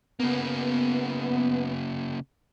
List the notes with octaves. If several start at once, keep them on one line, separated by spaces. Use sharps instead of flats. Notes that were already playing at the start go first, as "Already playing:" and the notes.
C#3 A#3 B3